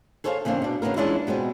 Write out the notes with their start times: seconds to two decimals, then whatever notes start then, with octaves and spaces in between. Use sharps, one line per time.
0.24 G#4 A4 C5 C#5 D#5 F5
0.45 C#3 E3 A#3 C4 D4
0.62 B2 D4
0.82 C#3 E3 A#3 B3 A#4
0.96 E3 G#3 C#4 D4 E4 F4
1.27 B2 G#3 B3 C4